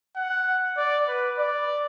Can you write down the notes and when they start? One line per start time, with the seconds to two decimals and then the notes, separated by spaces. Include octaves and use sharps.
0.16 F#5
0.77 D5
1.08 B4
1.38 D5